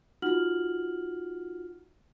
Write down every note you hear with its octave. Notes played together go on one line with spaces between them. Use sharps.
D#4 F4 F#4 F#5 F6 F#7